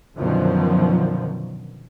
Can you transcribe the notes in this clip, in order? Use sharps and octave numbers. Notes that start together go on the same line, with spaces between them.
F#2 B2 D3 D#3 F3 F#3